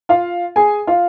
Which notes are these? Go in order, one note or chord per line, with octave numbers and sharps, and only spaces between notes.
F4 F5
G#4 G#5
F4 F5